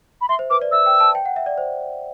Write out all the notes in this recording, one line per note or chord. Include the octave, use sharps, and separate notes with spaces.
B5
E5 C6
C5
B4 D6
D5
E5 E6
G5
A5
G5
F#5
E5
D5
C5